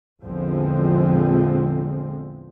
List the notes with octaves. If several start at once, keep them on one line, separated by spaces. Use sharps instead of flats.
A#1 E2 D3 F3 G#3 C4